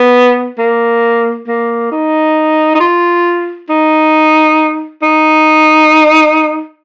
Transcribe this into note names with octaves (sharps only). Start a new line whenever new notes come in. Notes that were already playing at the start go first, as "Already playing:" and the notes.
Already playing: B3
A#3
A#3
D#4
D#4
F4
D#4
D#4